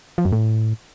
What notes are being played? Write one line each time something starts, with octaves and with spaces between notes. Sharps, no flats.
F3
F#2
A2